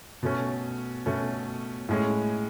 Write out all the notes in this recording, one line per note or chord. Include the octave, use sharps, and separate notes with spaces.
B2 A3 C#4
B2 A3 C#4
A2 G#3 C#4